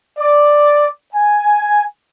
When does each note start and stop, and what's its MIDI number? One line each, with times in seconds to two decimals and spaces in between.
0.18 0.88 74
1.14 1.83 80